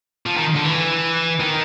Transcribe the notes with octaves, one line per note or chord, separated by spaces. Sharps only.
F3
D#3
D3
E3
D#3